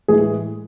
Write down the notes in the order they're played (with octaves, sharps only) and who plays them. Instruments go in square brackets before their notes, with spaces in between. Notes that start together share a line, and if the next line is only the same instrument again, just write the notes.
[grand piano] A2 E3 G#3 [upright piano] G#4